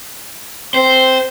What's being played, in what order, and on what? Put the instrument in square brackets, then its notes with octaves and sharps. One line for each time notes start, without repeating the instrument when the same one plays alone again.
[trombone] C4 [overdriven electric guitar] C5